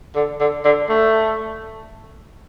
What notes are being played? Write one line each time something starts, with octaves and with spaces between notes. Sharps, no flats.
D3
D3
D3
A3